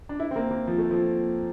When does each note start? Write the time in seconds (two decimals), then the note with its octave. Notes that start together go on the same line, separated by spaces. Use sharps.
0.09 D4
0.20 E4
0.31 C4
0.36 A#3
0.51 A#3
0.67 F3
0.78 A3
0.91 F3